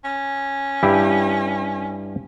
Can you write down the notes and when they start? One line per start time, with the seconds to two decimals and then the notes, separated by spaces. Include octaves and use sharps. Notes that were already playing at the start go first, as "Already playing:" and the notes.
0.04 C#4
0.83 G2 E4 G4